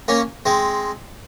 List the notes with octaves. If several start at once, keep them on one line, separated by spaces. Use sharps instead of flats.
A#3 C#4
G#3 C4